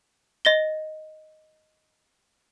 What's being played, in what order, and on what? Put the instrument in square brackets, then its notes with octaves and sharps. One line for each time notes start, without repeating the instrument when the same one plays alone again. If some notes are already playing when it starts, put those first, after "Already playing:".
[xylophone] D#5 A#6 G7